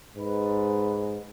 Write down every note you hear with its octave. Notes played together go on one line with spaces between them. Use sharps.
G#2 D#4 B4